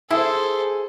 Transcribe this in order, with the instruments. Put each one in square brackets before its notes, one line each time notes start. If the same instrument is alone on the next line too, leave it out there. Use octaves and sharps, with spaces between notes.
[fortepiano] E4 [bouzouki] G#4 [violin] A4 C5